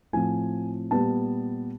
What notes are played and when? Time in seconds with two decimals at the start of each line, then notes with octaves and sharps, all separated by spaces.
0.13 A2 F3 A3 C4 G#5
0.91 A#2 G3 B3 A5